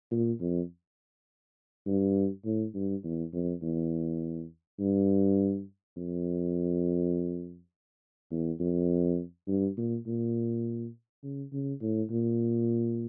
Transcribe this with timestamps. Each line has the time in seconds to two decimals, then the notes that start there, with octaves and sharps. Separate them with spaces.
0.11 A#2
0.40 F2
1.87 G2
2.45 A2
2.74 G2
3.04 E2
3.33 F2
3.62 E2
4.80 G2
5.96 F2
8.31 E2
8.60 F2
9.48 G2
9.77 A#2
10.06 A#2
11.23 C#3
11.53 C#3
11.82 A2
12.11 A#2